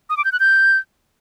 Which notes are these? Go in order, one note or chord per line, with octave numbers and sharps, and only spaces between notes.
D#6
D6
G6
F#6
G6